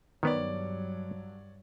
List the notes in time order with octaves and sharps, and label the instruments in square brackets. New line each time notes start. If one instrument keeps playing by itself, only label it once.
[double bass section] G2 F#3 [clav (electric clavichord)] D#3 B3 [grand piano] C#5 D5